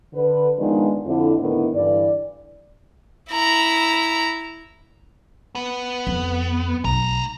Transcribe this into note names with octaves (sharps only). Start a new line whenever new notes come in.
D3 B4
D#3 F3 G#3 B3 D4 D#4
F2 D3 E4
A2 D3 D#3 B3 E4
G2 D3 E3 D5
E4 A#5
B3
F2
B1 A3 A#5